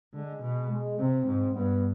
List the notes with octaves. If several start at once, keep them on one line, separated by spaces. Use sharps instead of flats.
D3 G#3
B2
G#3
C3 C4
G#2
G2 B3